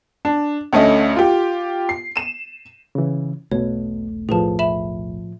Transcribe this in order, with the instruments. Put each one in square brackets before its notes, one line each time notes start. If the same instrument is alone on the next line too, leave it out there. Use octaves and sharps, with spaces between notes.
[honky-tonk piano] D4
D2 A3 C#4 D#5
F4 G4
C7
D#7 E7
[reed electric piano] C#3 E3
[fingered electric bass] E1 B1 A3 [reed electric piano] B2 [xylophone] C#5
[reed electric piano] A2 F3 [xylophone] G#4 B4 A5
[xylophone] E5 B5 E7